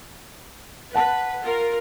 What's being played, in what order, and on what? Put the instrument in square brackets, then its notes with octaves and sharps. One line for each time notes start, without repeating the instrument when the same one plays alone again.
[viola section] B4 [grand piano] F#5 A5
[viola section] F4 A#4